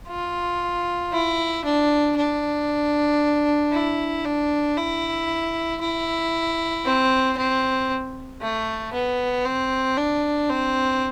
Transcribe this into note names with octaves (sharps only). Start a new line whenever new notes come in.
F4
E4
D4
D4
E4
D4
E4
E4
C4
C4
A3
B3
C4
D4
C4